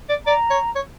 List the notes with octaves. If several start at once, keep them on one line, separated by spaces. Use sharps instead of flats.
D5
D5 A#5
C#5
C#5